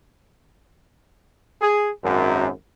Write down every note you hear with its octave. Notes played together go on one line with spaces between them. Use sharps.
G#4
G#1 F#2